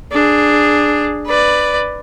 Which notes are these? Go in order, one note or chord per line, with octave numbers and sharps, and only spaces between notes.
D4 G#4
B4 D5